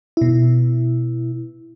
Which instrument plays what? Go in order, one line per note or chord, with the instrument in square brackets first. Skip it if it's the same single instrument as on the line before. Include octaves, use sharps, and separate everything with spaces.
[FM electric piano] B2 E4